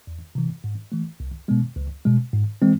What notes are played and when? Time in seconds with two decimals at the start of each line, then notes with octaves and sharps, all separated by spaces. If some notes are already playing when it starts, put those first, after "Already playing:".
0.07 E2
0.35 C3 E3
0.64 G#2
0.92 E3 A3
1.20 C2
1.48 B2 G#3 B3
1.76 C#2
2.05 B2 G#3
2.33 G#2
2.62 E3 G#3 C4